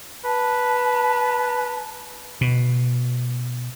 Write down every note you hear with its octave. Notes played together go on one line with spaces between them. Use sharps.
B4 A5
B2